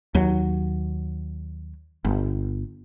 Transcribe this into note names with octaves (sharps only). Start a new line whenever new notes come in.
D#2 F#3
G1